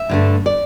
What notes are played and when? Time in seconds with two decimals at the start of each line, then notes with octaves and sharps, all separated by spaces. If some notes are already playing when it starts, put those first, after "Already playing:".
Already playing: E5
0.09 G2 D3 A3
0.46 D5